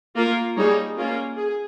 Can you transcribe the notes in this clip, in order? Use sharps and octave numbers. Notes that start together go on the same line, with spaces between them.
A#3 F4 A#4
G3 A#3 D#4 G#4 C#5
A#3 C#4 F4 A#4
G#4